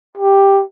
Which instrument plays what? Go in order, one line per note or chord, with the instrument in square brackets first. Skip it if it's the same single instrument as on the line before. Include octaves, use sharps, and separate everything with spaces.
[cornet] G4